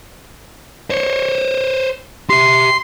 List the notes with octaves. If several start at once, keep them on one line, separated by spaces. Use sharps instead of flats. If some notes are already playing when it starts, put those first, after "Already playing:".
C5 C#5
G4 E5 C6